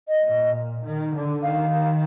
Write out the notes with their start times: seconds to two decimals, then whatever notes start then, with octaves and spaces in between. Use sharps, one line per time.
0.08 D#5
0.22 A#2
0.84 D#3
1.14 D3
1.43 D#3 F5